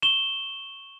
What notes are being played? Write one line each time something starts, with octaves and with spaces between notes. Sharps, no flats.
C#6 E7 G7